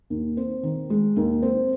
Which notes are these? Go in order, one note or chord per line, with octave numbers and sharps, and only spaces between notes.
D#2
C4
D#3
G#3
D#2
C4